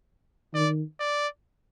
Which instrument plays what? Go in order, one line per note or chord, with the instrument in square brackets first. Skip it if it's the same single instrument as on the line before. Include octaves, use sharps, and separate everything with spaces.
[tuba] D#3 [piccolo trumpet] D5
[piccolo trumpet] D5